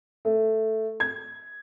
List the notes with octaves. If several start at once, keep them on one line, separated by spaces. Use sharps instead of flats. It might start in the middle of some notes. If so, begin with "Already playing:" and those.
A3
G#6